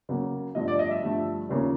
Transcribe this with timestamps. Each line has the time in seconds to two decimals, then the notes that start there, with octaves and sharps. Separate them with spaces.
0.09 C#3 F#3 A#3
0.55 G2 D3 F3 A3 D#5
0.68 D5
0.79 D#5
0.91 E5
1.03 G2 D3 F3 A3
1.49 D#2 C#3 F3 A#3 C#4